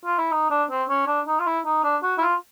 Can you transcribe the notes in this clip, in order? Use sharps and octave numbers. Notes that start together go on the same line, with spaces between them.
F4
E4
D#4
D4
C4
C#4
D4
D#4
F4
E4
D#4
D4
F#4
E4
F4